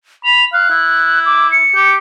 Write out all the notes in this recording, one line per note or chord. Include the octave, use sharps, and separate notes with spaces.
B5 F7
F5 F#6
E4
D6
C#7
G4